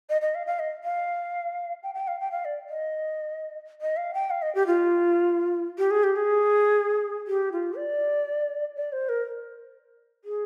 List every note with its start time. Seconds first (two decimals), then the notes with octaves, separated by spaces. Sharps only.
0.09 D#5
0.22 D#5
0.35 F5
0.47 F5
0.59 D#5
0.84 F5
1.83 G5
1.95 G5
2.08 F5
2.20 G5
2.32 F5
2.45 D5
2.69 D#5
3.81 D#5
3.97 F5
4.14 G5
4.30 F5
4.42 D#5
4.55 G4
4.67 F4
5.78 G4
5.91 G#4
6.03 G4
6.16 G#4
7.27 G4
7.52 F4
7.77 D5
8.76 D5
8.92 C5
9.09 A#4
10.25 G#4